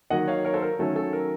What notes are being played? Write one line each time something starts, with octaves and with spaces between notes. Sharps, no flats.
D#3 F#3 A#3 D#5 F#5
C#5 F5
A#4 C#5
A4 C5
A#4
D#3 F#3 A3 C#4 A4
A4
A#4